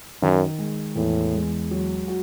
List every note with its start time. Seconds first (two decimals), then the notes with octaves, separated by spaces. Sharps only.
0.22 F#2 D#3
0.59 G#3
0.96 E2 A2
1.34 G#3
1.71 F#3
2.08 F#4